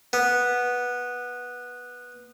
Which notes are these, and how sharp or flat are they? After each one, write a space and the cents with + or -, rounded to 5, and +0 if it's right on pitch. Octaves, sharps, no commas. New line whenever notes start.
B3 -10